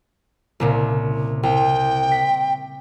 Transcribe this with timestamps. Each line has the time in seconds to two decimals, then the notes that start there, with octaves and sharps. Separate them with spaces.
0.60 C2 A#2 C#3
1.43 C2 G5
2.12 B6